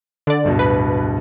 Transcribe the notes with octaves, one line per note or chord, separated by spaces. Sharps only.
D3 D5
D1 G2 B2
B4